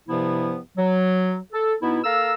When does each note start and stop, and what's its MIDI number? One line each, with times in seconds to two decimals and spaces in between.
0.08 0.57 43
0.08 0.57 48
0.08 0.57 53
0.08 0.57 59
0.08 0.57 64
0.77 1.36 54
1.53 1.74 69
1.81 2.00 47
1.81 2.00 59
1.81 2.00 63
1.81 2.00 64
2.04 2.33 58
2.04 2.33 69
2.04 2.33 77
2.04 2.33 82
2.04 2.33 88